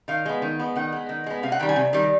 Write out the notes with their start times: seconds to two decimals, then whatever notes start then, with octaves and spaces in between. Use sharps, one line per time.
0.08 D#3 F5
0.25 G#3 B3
0.42 D#3
0.59 G#3 B3
0.76 D#3 F#5
0.92 G#3 B3
1.09 D#3
1.26 G#3 B3
1.43 C3 F5
1.52 F#5
1.59 D#3 G3 G5
1.69 G#5
1.76 C3
1.93 D#3 G3